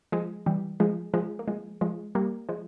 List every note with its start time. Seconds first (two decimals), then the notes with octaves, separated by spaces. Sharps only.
0.12 F3 G#3
0.46 E3 G3
0.80 F3 G#3
1.14 F3 G#3
1.39 A#3
1.48 F3 G#3
1.81 F3 G#3
2.15 G3 A#3
2.49 F3 G#3